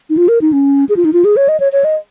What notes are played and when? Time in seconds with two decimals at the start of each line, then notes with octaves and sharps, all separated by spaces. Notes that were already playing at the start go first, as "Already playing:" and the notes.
0.10 D#4
0.17 F4
0.28 A#4
0.41 D#4
0.53 C#4
0.89 G#4
0.96 F4
1.05 D#4
1.13 F4
1.25 G#4
1.37 C#5
1.49 D#5
1.60 C#5
1.73 C#5
1.84 D#5